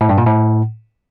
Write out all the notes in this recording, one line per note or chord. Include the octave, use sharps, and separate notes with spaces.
A2
G2
A#2
A2